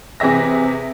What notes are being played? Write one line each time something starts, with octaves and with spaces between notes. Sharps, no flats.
C3 E3 G#4 E5 A#6